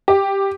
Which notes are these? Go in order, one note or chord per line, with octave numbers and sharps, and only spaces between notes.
G4